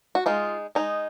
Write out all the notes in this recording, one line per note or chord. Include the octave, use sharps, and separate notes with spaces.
F#4
G#3 D#4 F4
G#3 D#4